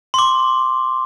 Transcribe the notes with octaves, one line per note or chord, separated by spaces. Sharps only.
C6
D6